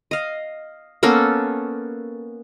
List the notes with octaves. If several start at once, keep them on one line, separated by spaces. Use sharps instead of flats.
D#5 F5
A#3 B3 C#4 A4